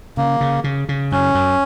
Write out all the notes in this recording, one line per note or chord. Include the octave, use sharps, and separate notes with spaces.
C#3 A#3
C#3
C#3
C#3
F#2 C#4
F#2